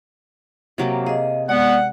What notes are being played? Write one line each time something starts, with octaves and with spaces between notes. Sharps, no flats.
C3 F#3 A#3
G#4 D#5 F5
G#3 B3 D5 F#5